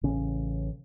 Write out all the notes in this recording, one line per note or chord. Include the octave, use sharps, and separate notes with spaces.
A1 C#3 C#4